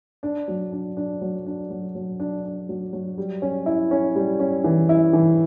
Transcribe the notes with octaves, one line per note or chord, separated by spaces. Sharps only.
D4
F#3
D4
D4
F#3
D4
F#3
F#3
D4
D4
F#3
F#3
G3
C#4
E4
C#4
G3
C#4
E3
E4
E3